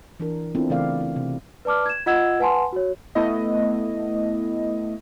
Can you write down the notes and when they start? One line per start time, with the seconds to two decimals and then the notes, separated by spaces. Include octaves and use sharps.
0.20 E3 D4 A#4
0.55 B3 C4 D4 E4 F4 A4
0.70 C#3 E3 A3 A#4 D5 F5
1.00 E4
1.16 C3
1.65 B4 D5 A5 D6 F6
1.86 G#6 E7
2.06 F4 D#5 F#5 E6 G#6 E7
2.40 B4 F#5 G#5 A5 C6
2.72 F#4 C#5
3.15 A3 B3 E4 D#5